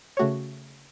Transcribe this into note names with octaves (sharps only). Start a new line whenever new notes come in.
C#3 A3 F#4 C#5